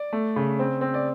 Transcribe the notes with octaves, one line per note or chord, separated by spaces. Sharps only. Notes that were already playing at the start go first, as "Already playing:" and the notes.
Already playing: D5
A3
C#3
C4
C4
D5